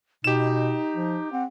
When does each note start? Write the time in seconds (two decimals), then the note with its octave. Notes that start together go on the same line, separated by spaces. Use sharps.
0.24 B2 D#4 G4 E7
0.96 F3
1.33 C4 F#5